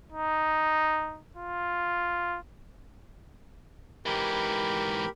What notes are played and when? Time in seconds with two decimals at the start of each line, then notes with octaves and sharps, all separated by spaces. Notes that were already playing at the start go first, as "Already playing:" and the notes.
0.12 D#4
1.36 F4
4.06 G#2 E3 G4 A#4 B5